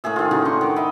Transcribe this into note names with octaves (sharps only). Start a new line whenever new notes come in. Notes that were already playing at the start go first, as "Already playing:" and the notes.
A2 A#3 G#4 E5
D#3 F4
A2 C#3 D#4 F#4
D4 C6 C#6
D#3 D6
D#5 E5 B5